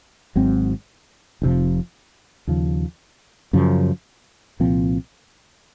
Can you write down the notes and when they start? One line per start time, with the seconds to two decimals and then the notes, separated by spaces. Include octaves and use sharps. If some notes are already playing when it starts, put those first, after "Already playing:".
0.35 G#1 G#2 F#3 C4
1.42 F1 F2 C3 F3
2.47 D#2 C#3 F3
3.53 F#2 C#3 F3
4.60 C2 A#2 F3 C4